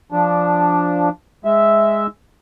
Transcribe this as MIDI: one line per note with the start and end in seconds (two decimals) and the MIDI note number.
0.12 1.09 53
0.12 1.09 62
1.45 2.07 56
1.45 2.07 76